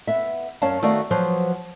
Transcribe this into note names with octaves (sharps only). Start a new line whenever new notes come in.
B3 E5
F#2 C#4 C#5 D5 F5 A5
D#3 A3 B3 F#4 D5 F5
F3 F#3 B4 C5